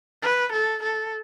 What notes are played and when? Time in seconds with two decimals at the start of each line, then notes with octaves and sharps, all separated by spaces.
0.22 B4
0.53 A4
0.83 A4